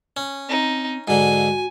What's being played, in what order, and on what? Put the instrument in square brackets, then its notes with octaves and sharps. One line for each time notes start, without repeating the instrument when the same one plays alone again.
[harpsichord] C#4
[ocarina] C4 [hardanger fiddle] D#4
[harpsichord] G#2 D3 [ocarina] F#4 [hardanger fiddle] G#5